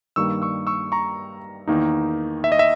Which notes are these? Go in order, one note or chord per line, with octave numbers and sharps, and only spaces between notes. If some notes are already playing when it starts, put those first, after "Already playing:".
G2 D#3 G3 A#3 C#6 E6
C#6 E6
C#6 E6
A#5 C#6
E2 D#3 A#3 D#4
E5
D#5
E5